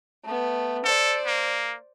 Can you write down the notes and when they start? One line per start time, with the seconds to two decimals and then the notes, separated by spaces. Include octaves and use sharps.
0.24 A3 B3
0.84 A4 C5 D5
1.26 A#3